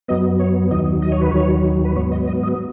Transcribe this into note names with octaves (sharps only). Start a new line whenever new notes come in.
F#2 F#3 B3 D#5
C#5
D#2 D#3 F#3 D#5
D#5
C#5
B4
D#2 D#3 F#3 C#5
B4
G#2 F#3 B3 C#5
D#5
D#5
D#5